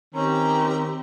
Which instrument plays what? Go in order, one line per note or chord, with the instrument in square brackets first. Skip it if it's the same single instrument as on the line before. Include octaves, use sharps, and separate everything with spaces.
[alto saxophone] D#3 [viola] C4 G4 [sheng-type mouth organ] C#4 [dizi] A#5